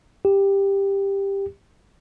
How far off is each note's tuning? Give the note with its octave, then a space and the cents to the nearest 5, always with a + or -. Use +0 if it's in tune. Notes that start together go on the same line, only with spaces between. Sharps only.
G4 +10